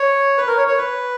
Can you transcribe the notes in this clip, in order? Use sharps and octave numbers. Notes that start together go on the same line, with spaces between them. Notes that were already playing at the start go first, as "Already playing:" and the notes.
Already playing: C#5
B4
A#4
C#5
C#5
B4